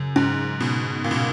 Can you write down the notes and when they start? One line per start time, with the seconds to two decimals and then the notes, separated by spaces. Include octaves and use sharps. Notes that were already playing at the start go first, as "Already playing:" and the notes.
Already playing: F#2 C#3
0.16 G#2
0.60 B2
1.04 A#2
1.11 B2